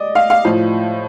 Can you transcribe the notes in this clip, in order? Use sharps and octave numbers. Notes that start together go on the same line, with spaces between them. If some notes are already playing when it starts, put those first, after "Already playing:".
Already playing: D5 D#5
F5
F5
A2 F3